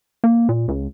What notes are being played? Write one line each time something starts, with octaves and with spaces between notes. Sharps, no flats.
A#3
A#2
C#2